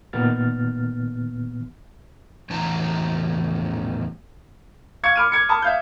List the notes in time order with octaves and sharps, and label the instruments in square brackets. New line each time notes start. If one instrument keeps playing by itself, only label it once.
[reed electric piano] A#2 D#3 B3 F6 A6
[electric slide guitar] E2 A2 E3 D#4 A5 A#5
[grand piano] F5 C#6 G#6 C#7
B5 D6 F6 D7 D#7
G#6 C#7
A5 B5 D#6
E5 F5 G6